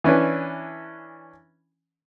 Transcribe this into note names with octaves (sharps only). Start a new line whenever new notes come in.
E3 C#4 D4 B4